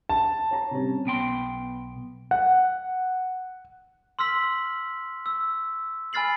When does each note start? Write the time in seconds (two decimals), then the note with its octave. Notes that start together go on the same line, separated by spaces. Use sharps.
0.09 A5
0.51 C#5 A#5
0.71 C3 G3 C#4
1.05 B1 B3 G5 C6
2.31 F#5
4.19 C6 E6 F6 B6 F#7
5.26 E6
6.13 G#5 B5 F6 A6 C7 F#7